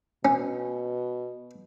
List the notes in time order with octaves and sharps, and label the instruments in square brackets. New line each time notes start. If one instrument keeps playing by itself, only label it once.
[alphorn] B2 [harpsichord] C#4